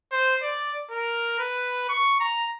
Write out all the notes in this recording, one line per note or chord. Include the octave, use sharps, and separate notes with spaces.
C5
D5
A#4
B4
C#6
A#5